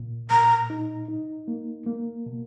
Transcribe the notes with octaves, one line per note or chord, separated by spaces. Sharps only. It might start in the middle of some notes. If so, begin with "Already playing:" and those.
Already playing: A#2
A#2 A#5
D#4
D#4
A#3
A#3
B2